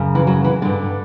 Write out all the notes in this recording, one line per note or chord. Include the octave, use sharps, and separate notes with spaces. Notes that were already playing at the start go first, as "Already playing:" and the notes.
Already playing: F#2 C#3
E3
F#3
E3
G2 D3